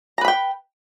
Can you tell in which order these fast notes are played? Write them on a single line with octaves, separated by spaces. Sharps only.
A#5 B4 B5 G5